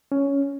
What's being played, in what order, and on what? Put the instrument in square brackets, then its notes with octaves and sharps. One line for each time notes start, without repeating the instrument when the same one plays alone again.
[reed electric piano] C#4